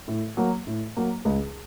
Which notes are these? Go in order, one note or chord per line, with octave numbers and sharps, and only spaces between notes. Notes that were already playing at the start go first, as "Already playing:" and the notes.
A2
F#3 A#3
A2
F#3 A#3
C#2